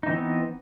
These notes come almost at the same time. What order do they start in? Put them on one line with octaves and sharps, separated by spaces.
D#4 E3 C4 B3